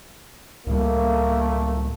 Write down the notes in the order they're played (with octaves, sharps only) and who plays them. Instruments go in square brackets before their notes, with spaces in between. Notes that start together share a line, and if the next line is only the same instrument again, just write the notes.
[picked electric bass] C#2 A2 G3 [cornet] A3 [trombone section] A#3